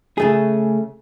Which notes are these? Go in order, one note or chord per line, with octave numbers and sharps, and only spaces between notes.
C#3 A3 G#4